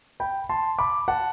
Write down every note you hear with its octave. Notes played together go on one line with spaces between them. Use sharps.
G5 B5
A5 C6
B5 D6
F#5 A5